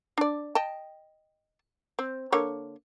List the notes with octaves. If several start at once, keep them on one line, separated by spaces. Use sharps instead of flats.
D4 D5
D#5 G5 A5
C4
D3 A#3 C#5